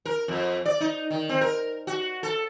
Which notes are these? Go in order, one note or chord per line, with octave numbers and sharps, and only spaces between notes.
A#4
F2
D5
D#4
D#3
C4
A#4
F#4
A4